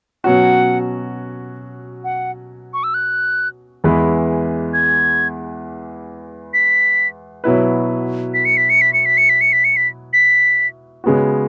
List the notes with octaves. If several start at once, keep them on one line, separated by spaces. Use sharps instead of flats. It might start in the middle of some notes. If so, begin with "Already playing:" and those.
B2 F#3 C#4 F#4 F#5
F#5
C#6
E6
F#6
E2 E3 G#3 E4 B4
G#6
B6
B2 F#3 E4 B4
B6
C#7
B6
C#7
B6
C#7
B6
C#7
B6
C#7
B6
C#7
B6
B6
C#3 G#3 B3 F#4